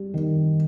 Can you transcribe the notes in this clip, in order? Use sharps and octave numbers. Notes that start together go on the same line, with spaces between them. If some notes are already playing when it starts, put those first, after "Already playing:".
Already playing: G3
D#3